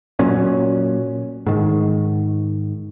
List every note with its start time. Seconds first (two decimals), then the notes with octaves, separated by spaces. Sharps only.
0.19 A#2 F#3 C#4
1.46 G#2 D#3